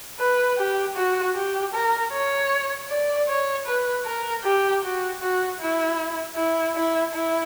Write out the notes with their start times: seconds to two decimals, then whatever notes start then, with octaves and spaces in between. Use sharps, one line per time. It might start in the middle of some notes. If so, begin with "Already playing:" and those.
0.19 B4
0.58 G4
0.96 F#4
1.35 G4
1.73 A#4
2.12 C#5
2.89 D5
3.28 C#5
3.66 B4
4.05 A#4
4.44 G4
4.83 F#4
5.21 F#4
5.60 E4
6.36 E4
6.75 E4
7.14 E4